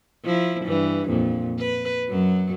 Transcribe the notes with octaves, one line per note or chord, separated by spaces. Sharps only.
F3 E4
G2 E3
F2 A#2
B4
F#2 F#3